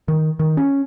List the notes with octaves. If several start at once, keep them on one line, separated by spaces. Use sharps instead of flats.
D#3
D#3
C#4